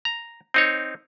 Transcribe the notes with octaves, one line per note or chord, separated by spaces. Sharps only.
A#5
C4 D#4 C#5